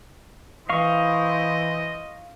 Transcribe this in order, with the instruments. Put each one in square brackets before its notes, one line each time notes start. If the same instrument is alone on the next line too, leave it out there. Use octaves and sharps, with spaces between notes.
[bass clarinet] E3 [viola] E4 C5 [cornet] D#5 [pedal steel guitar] F5 C#6